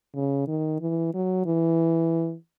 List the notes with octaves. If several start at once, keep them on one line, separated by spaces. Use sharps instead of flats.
C#3
D#3
E3
F#3
E3